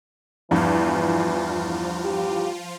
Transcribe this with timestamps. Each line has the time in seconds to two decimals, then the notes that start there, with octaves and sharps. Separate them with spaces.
0.51 E2 G2 E3 F3 F4
2.05 G4